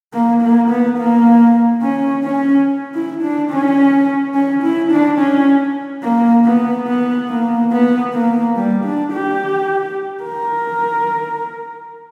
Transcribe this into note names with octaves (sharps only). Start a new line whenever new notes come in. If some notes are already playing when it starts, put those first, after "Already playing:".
A#3
A#3
B3
A#3
C#4
C#4
E4
D4
C#4
C#4
E4
D4
C#4
A#3
B3
B3
A#3
B3
A#3
G3
D4
G4
A#4